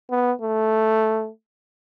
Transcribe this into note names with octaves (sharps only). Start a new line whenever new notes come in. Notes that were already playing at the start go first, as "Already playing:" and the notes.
B3
A3